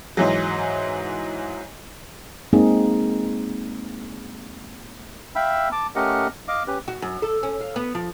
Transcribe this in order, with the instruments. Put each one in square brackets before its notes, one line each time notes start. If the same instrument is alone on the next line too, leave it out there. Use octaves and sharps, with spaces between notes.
[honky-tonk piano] G#2 E3 F#3
[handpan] G#3 A#3 C4 D#4 G#4
[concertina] E5 F5 G5 B5 E6
A5 D6
A3 C#4 G4 A#4 D#5 F#5
D#5 F5 D6
C#4 G4 B4
[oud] F#4
F#2
A4
C#4
F5
B3
F3